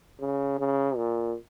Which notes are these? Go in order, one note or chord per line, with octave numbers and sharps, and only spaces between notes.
C#3
C#3
A#2